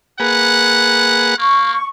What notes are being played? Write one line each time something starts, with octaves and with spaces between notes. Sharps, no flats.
A#3 G#4 B4 F#5
A#3 C#6